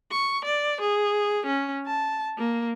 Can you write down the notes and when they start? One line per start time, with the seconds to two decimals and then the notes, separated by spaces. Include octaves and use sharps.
0.12 C#6
0.45 D5
0.81 G#4
1.46 C#4
1.87 A5
2.38 A#3